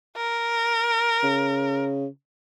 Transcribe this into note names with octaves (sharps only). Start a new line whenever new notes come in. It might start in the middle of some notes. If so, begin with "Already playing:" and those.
A#4
C#3